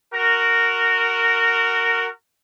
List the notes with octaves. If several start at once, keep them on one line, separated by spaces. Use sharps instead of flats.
F#4 A#4